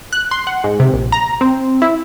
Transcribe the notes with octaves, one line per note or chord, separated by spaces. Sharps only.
F#6
C6
F#5
G#2
C3
A#1
A#5
C4
E4